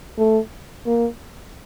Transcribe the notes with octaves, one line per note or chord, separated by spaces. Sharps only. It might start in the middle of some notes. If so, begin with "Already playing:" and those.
A3
A#3